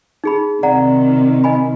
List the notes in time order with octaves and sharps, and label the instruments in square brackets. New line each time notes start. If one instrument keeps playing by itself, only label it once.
[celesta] D#4 G#4 B5
[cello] C3 D#3 [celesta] D5 F#5 A#5
[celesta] D#5 G#5 B5